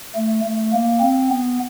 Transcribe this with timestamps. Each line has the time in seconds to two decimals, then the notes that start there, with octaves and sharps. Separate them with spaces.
0.15 A3
0.44 A3
0.73 A#3
1.01 C4
1.30 B3